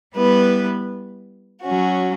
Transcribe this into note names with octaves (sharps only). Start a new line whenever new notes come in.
G3 B3 E4 B4
F#3 C#4 F#4